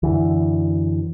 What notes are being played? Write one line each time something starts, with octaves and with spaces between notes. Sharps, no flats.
F#2 D3 E3